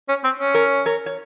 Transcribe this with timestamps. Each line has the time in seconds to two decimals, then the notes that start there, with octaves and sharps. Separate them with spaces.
0.08 C#4
0.24 C4
0.39 C#4
0.54 A#4 C#5
0.86 A#4 C#5
1.06 C#5